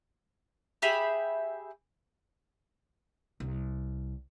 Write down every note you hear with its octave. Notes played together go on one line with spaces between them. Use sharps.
G4 G#4 E5 B5
C2